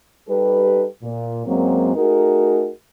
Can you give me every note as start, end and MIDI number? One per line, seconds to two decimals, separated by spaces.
0.29 0.86 55
0.29 0.86 63
0.29 0.86 67
0.29 0.86 69
0.29 0.86 71
1.03 1.43 46
1.46 1.93 42
1.46 1.93 54
1.46 1.93 56
1.46 1.93 58
1.46 1.93 60
1.96 2.70 57
1.96 2.70 63
1.96 2.70 66
1.96 2.70 68
1.96 2.70 70